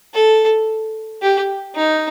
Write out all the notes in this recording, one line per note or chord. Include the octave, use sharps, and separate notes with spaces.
A4
G4
D#4